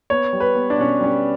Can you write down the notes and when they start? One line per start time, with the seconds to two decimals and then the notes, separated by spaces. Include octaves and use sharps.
0.10 B3 C#5
0.33 G3
0.40 B4
0.55 B3
0.70 D4
0.77 B2 C#4
1.00 G3 C#4